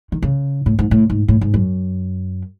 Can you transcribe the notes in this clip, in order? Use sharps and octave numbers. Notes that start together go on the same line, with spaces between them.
D#3
C#3
A2
G#2
A2
G#2
A2
G#2
F#2